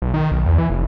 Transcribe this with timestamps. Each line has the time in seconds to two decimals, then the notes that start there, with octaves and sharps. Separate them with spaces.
0.02 B1
0.14 D#3
0.31 B1
0.46 E2
0.58 E3
0.70 F1